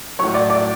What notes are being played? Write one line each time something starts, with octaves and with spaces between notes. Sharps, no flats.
A2 F#3 C#5 C#6
D5 D6
D5 D6